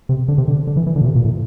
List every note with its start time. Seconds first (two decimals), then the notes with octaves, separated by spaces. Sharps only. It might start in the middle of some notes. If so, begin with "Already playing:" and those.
0.09 C3
0.28 D3
0.38 C3
0.48 D3
0.67 D3
0.77 E3
0.87 E3
0.96 D3
1.01 A#2
1.06 C3
1.15 A#2
1.25 A2